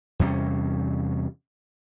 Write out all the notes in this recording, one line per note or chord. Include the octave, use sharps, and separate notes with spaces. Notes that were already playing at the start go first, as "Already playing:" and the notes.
E2 C3 G3 C#4